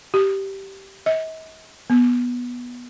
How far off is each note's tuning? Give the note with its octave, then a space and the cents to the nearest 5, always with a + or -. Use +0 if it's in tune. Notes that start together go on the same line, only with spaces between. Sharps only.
G4 -10
D#5 +45
B3 -10